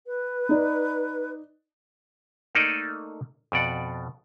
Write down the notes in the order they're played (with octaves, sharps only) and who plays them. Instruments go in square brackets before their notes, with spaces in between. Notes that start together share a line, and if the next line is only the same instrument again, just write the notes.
[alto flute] B4
[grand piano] D#4 D5
[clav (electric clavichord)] A3 A#3 D#4 A4 D5 D#5
F2 B2 D5 F#5